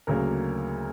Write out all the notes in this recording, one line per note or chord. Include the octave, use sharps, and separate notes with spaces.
D2 C#3 F#3 A#3 A#4